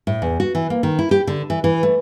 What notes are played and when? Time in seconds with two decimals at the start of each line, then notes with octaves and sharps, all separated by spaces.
0.07 A2
0.22 E2
0.40 F#4
0.55 E3
0.70 A#3
0.83 D#3
0.99 E4
1.11 G4
1.27 D3
1.50 E3
1.64 E3
1.83 A3